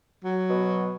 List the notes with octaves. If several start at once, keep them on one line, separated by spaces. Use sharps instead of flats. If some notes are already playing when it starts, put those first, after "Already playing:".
F#3
B2